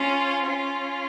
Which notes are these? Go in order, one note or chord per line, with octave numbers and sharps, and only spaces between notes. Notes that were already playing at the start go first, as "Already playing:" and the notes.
Already playing: C#4 F4
C#4 F4